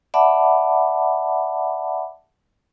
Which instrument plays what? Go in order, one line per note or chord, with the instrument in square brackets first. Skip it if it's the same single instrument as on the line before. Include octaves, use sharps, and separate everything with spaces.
[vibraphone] D5 E5 F#5 A5 B5 D6